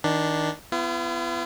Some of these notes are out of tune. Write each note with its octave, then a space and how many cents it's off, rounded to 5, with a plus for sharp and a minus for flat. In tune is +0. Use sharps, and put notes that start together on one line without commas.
D#3 +20 D4 +0
B3 +25 F4 -45